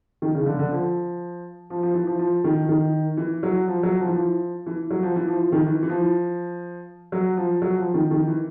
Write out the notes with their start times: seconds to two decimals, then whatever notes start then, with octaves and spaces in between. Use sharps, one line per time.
0.22 D#3
0.35 C#3
0.46 D3
0.59 D3
0.71 F3
1.70 F3
1.83 F3
1.94 E3
2.07 F3
2.19 F3
2.44 D#3
2.69 D#3
3.17 E3
3.43 F#3
3.68 F3
3.83 F#3
4.00 F3
4.07 E3
4.15 F3
4.66 E3
4.91 F#3
5.03 F3
5.16 E3
5.28 F3
5.40 F3
5.52 D#3
5.65 E3
5.83 E3
5.89 F3
7.12 F#3
7.37 F3
7.62 F#3
7.78 F3
7.94 D#3
8.11 D#3
8.27 E3